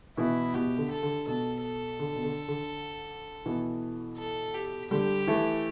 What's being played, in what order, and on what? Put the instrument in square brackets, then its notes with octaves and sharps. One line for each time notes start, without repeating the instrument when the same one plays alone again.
[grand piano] B2 E3 [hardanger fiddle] E4
[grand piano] B2 [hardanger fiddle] G4
[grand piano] D3
[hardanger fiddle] A4
[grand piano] D3
[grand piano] B2 [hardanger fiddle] A4
[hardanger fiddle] A4
[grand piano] D3
B2
D3
D3
B2 E3
[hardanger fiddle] A4
G4
[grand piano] D3 G3 [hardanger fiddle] G4
[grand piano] E3 A3